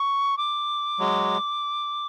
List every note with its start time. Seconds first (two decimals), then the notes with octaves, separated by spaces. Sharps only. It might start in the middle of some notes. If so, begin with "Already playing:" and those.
Already playing: C#6
0.38 D6
0.99 F#3 G#3